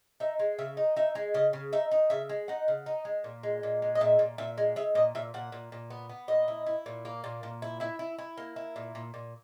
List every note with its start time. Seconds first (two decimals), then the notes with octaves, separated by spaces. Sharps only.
0.20 D#4 E5
0.39 G#3
0.58 C#3 E5
0.77 D#4
0.96 D#4 E5
1.15 G#3
1.34 C#3 D#5
1.53 C#3
1.73 D#4 E5
1.91 D#4
2.10 C#3 E5
2.29 G#3
2.48 D#4 F#5
2.68 C#3
2.86 D#4
3.05 G#3
3.24 A#2
3.43 G#3
3.63 A#2
3.82 G#3
3.95 D#5
4.01 A#2 E5
4.19 A#2
4.38 A#2 E5
4.58 G#3
4.76 G#3 E5
4.95 A#2 D#5
5.15 A#2 E5
5.34 A#2 F#5
5.52 A#2
5.72 A#2
5.90 B3
6.09 B3
6.28 A#2 D#5
6.48 E4
6.66 E4
6.86 A#2
7.05 A#3
7.24 A#2
7.43 A#2
7.62 E4
7.80 E4 E5
7.99 E4
8.18 E4
8.37 A#3
8.56 E4
8.76 A#2
8.95 A#2
9.14 A#2